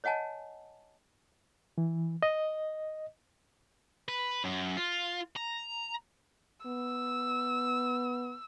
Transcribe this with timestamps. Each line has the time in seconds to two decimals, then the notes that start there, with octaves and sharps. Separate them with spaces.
0.04 C#5 D#5 F#5 G#5 A5
1.78 E3
2.23 D#5
4.09 B4
4.44 F#2
4.77 F4
5.37 A#5
6.66 B3 E6